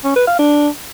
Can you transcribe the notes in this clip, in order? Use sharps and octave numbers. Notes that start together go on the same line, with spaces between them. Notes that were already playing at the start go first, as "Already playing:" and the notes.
C#4
B4
F5
D4